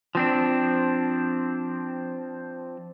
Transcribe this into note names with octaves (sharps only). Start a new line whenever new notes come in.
F3 C4 D4